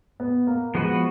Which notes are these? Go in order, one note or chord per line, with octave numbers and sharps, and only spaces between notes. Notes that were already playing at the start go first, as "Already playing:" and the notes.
B3
A#3
F3 G#3 B3 F#4 B4